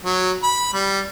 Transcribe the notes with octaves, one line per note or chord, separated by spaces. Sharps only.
F#3
B5
G3